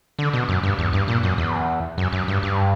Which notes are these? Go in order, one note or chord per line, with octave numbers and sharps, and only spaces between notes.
D3
B2
F#2
G2
E2
G2
A#2
F#2
E2
F#2
F#2
G2
G2